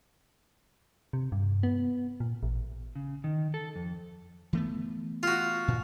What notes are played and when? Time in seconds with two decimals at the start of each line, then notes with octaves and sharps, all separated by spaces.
1.13 C3
1.32 G2
1.63 B3
2.20 A#2
2.43 A1
2.96 C#3
3.24 D#3
3.54 A4
3.75 F2
4.53 E3 A3 B3
5.23 F4 F#4
5.68 A#2